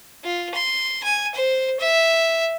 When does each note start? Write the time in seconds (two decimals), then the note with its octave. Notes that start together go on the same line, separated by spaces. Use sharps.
0.24 F4
0.54 C6
1.03 G#5
1.34 C5
1.80 E5